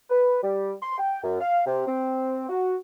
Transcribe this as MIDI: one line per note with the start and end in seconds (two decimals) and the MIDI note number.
0.10 0.42 71
0.43 0.73 55
0.82 0.96 84
0.98 1.21 79
1.23 1.37 42
1.41 1.64 77
1.66 1.86 48
1.87 2.45 60
2.49 2.76 66